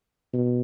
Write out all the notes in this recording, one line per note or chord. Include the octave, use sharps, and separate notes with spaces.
B2